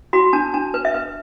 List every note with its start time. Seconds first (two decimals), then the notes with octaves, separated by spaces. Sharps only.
0.13 F#4 B5
0.33 D4 A5
0.54 D4 A5
0.74 B4
0.85 E5
0.94 B4